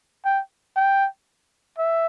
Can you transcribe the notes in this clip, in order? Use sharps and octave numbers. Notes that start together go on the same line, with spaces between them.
G5
G5
E5